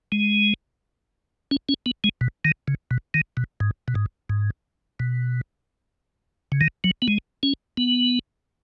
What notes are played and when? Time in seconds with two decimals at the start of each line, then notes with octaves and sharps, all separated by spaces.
0.12 G#3
1.51 C#4
1.69 C#4
1.86 B3
2.04 G#3
2.21 B2
2.45 D#3
2.68 C#3
2.91 B2
3.14 D#3
3.37 B2
3.60 G#2
3.88 B2
3.95 G#2
4.29 G#2
5.00 B2
6.52 C#3
6.61 D#3
6.84 F#3
7.02 B3
7.08 G#3
7.43 C#4
7.77 B3